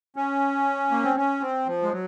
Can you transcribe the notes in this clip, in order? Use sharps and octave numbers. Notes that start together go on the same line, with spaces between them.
C#4
A#3
C4
C#4
C4
F3
G#3
F#3